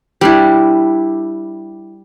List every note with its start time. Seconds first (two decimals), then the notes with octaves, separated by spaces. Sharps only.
0.21 G3 D4 E4